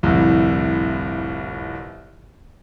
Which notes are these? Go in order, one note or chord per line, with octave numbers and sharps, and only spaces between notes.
G1 C2 F2 A2